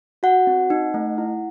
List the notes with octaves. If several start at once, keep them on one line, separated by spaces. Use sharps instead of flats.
F#4 F#5
C4
D#4
A3
E4